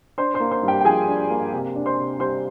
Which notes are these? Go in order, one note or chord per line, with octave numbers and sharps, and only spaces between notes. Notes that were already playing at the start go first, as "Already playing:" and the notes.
D4 C5 C6
C5 C6
A#3
C5 C6
G2
G4 G5
G5
F3 G#4 G#5
D4
A#3
C3
D4
C5 C6
C3
G3 C5 C6